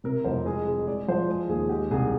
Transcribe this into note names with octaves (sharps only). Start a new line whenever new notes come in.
C3 A#4
F1 C5
G#3 G#4
G#3
G#3 D5
F3 C5
G#3
D#2 G#4
G#3 G4
C2 G#4